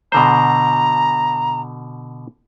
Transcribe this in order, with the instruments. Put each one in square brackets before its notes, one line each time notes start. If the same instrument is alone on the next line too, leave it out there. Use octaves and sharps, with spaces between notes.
[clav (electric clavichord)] B2 D3 C5 [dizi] A#5